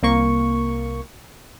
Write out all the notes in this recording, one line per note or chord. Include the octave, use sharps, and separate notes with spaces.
C2 A#3 C#6